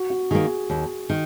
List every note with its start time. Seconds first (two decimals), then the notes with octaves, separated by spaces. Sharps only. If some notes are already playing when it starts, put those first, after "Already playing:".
Already playing: F#4
0.10 F#4
0.31 D#3 A#3 G#4
0.70 D#2
1.10 D#3